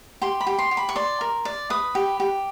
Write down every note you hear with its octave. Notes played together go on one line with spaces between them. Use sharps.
G4 C6
B5
G4
C6
G4
B5
C#6
D5 C6
A#4
D5
B4 D#6
G4
G4